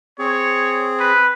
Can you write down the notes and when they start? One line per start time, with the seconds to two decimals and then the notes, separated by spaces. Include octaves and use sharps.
0.19 C4 G#4 C#5
1.00 B4